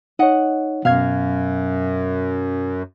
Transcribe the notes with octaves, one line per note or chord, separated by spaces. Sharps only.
D#4 C#5 D#5 F#5
F#2 B2 F5 F6 G#6